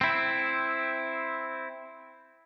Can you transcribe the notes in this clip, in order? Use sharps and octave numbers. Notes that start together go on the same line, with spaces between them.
C4 E4